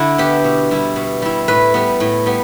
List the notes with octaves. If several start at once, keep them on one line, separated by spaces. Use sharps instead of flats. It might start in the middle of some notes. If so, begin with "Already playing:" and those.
Already playing: D3 E4 A4
B3 D4 G4
B2
G3 E4
B2
G3 E4
A2 B4
G3 B3
A2
G3 B3